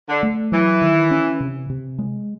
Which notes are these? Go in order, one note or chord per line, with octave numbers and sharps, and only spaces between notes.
D3
A3
E3 F#3
D#3
C#4
C3
C3
G#3